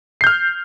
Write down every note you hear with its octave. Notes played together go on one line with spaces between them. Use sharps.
F6 G6 C7